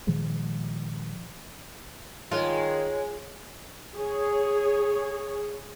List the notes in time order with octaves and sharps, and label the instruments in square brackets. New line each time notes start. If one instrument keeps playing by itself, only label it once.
[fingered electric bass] A#2 D#3 F3 G#3
[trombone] D#3 [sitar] G#3 [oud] F4 [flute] C#5
[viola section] G#4 C#5